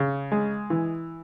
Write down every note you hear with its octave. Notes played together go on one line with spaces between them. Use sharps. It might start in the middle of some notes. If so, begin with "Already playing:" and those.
Already playing: C#3
G#3
E3